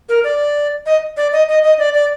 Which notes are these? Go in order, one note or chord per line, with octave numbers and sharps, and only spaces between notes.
A#4
D5
D#5
D5
D#5
D#5
D#5
D5
D5